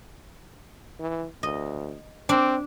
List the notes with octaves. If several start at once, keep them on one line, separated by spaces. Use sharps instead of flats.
E3
D2 D#5
C4 D4